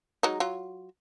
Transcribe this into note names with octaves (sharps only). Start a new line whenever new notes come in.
F#3 G#3 D#4
F#3 F4